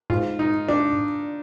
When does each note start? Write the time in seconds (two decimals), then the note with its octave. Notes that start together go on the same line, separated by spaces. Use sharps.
0.10 G#2 F4
0.39 D#4
0.69 D4